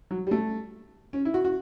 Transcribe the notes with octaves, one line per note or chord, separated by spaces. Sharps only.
F#3
G3
A3
C#4
E4
F#4
F#4